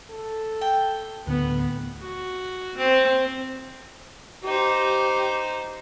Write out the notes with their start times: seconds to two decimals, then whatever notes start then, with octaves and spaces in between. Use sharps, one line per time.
0.11 A4
0.61 G5
1.27 D2 A2 D3 B3
2.00 F#4
2.77 C4
4.44 D#4 G4 C5